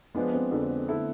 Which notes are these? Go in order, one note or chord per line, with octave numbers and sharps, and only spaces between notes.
F3 G#3 B3 D4
C4
F2 D3 G#3 D4
D3 A3 E4 A4